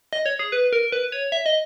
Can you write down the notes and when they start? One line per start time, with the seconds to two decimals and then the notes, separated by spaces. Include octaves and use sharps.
0.13 D#5
0.26 C#5
0.39 G#4
0.52 B4
0.73 A#4
0.92 B4
1.12 C#5
1.32 E5
1.46 D#5